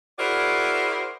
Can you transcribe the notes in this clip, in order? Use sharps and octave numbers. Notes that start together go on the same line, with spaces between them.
E4 F#4 G#4 A#4 C5 D5